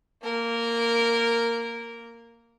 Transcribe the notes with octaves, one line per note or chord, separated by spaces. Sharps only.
A#3 A#4